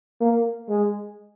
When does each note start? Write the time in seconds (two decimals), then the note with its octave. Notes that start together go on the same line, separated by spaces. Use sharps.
0.21 A#3
0.69 G#3